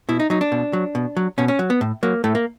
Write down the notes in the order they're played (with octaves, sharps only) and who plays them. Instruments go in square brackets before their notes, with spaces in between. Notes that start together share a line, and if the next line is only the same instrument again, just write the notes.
[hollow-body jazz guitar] B2 E4
D#4
F#3 D#4
D4
B2
F#3
B2
F#3
B2 C#4
C#4
F#3
B3
A2
F#3 A#3
A2 A3
A#3